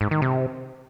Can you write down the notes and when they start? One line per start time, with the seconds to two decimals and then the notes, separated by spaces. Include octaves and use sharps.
0.01 G#2
0.11 D#3
0.22 C3